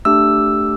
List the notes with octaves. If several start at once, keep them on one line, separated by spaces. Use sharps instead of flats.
A3 D4 G4 E6